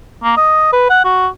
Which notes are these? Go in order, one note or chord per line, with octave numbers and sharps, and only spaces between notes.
A#3
D#5
B4
F#5
F#4